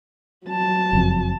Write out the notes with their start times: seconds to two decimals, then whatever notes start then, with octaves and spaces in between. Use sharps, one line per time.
0.46 F#3 A5
0.93 F#1 F2